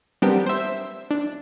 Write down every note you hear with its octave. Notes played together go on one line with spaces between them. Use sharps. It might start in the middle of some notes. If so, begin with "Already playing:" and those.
G3 B3 C4 D4 G4 A#4
C5 E5
D4